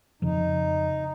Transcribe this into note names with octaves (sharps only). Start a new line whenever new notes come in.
F2 C#3 F3 D#4